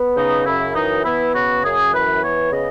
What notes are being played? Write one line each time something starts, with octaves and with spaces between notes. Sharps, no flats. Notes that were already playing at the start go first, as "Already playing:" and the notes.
Already playing: B3
C#3 D#4
F#2 E4
E3 D#4
B3 E4
C#3 F#4
F#2 G#4
E3 B4
B3 C#5
C#3 D#5